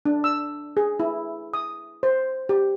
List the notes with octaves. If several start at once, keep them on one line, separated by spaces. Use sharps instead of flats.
D4
E6
G#4
E4
D#6
C5
G4